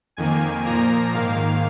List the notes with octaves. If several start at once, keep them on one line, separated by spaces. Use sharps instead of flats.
F2 D#3 A#3 G#5
A#2 F3 A#3 A#5
G#2 D#3 A#3 F5